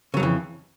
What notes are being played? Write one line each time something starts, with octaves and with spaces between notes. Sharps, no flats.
F2 C#3 E3 F#3